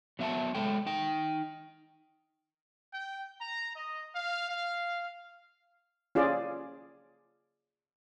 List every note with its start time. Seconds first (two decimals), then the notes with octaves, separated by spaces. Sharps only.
0.19 F#3 B3 E5 F#5 A5
0.55 G#3 A3 A4 G5
0.86 D#4 G5
2.93 G5
3.41 A#5
3.75 D#5
4.13 F5
4.49 F5
6.15 C#4 F4 G#4 D5